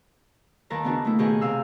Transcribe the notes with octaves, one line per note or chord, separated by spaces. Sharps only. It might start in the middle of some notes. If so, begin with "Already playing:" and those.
D#2 D#3 A#4 B4 A5 A#5
C#3 B3 D4 D#4 F#4
A3 A#3 E4
B2 D#3 G4 G#4 D#5 G#5
C3 F5 E6